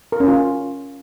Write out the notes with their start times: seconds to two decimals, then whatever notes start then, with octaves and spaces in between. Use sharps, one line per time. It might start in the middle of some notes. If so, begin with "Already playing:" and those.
0.12 A#4
0.20 C#4
0.28 F4